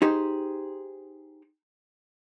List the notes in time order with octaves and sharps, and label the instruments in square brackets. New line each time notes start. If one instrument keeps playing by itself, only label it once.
[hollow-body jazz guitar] D#4 G4 G#4 C5